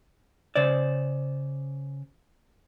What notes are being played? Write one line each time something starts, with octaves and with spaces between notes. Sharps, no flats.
C#3 C5 D5